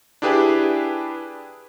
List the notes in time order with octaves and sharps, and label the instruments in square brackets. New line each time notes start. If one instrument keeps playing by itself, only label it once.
[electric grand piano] D4 E4 G4 G#4 B4